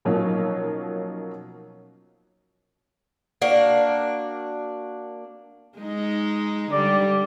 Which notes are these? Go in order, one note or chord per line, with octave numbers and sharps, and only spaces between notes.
B2 F3 F#3 A#3 C#4 D#4
A#3 D4 F#4
G#3 D#4
D3 G3 D5